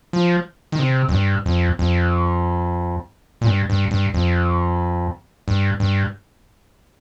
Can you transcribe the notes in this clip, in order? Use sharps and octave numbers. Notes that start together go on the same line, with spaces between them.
F3
D#3
C3
F2
G2
F2
F2
A#2
G2
G2
G2
F2
G2
G2